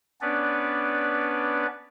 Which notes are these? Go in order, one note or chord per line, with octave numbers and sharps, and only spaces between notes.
B3 C#4 D4 B4 D5